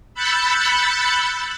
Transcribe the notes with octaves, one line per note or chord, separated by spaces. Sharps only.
B5 E6 F#6 G6 A6 C#7